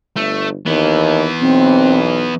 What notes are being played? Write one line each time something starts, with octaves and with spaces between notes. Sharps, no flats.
G1 A3
D#2 E3 B3
B1 C4